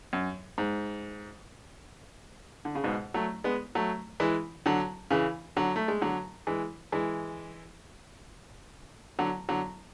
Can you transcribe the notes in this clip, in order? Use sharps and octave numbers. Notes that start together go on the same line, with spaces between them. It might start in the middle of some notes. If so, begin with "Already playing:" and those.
F#2
G#2
D3
C#3
G#2 B2
F#3 A3
G#3 B3
F#3 A3
E3 G#3
D3 F#3
C#3 E3
D3 F#3
A3
G#3
D3 F#3
E3 G#3
E3 G#3
D3 F#3
D3 F#3